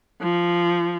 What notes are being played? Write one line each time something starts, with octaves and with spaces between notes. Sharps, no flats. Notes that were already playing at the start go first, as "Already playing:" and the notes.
F3